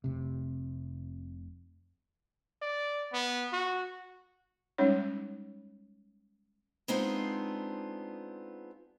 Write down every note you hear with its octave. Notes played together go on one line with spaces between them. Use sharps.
F1 C3
D5
B3
F#4
G3 G#3 C#4 D#4 C#5
G#3 B3 C4 D4 D#4 F4